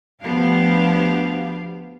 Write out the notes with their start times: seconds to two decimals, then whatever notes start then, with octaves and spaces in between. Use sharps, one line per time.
0.23 D2 F3 B3 D4 G4 F5